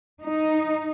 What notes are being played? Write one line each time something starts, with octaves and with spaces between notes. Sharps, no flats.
D#4